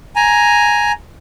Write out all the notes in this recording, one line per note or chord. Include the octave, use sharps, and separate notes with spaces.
G#5 A#5